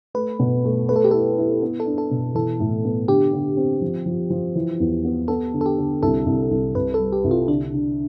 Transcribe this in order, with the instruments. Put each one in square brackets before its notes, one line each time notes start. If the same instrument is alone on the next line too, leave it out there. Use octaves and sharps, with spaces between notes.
[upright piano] A3 [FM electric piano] B4
[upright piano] B2
A3
[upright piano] A3 [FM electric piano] B4
[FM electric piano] A4
G4
[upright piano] E4 [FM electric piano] A4
[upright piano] E4
B3
[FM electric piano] A4
[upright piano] D4
[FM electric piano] A4
[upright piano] B2
[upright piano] E3 [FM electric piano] A4
[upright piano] A2
B3
[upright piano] D3 [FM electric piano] G4
[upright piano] D3
C4
F3
F3
F3
E3
E2
B3
[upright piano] B3 [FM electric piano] A4
[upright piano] D3
[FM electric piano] A4
G4
[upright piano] D3
[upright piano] C2 [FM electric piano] A4
[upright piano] C2
C2
[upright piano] C2 [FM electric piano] B4
[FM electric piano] A4
[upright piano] G3
[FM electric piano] G4
[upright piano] C2
[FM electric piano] F4
[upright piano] D3 [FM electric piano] D4
[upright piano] D3